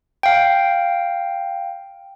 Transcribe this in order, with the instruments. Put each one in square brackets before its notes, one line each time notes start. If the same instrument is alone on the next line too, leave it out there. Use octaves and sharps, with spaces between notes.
[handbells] F5 G5